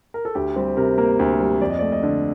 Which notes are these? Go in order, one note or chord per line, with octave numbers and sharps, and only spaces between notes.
A#4
A4
D2 G4
G3 C4
C3 A#4
A#3 A#4
D2
G3
F2 D5
D#5
A3 D5
D#5
D3